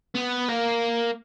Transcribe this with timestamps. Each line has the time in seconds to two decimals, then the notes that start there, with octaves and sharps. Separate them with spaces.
0.15 B3
0.49 A#3